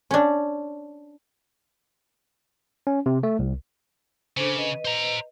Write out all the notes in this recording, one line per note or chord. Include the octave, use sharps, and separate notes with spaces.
C#4 D4
C#4
C3
A3
C2
C#3 D4 A4 C5
B4 D#5
C5 A#5